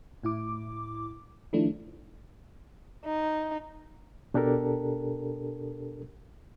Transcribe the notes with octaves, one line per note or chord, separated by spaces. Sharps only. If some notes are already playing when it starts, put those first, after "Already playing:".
A2 E4 D6
D#3 F3 A3 D4 E4
D#4
B2 D4 G4 A4 A#4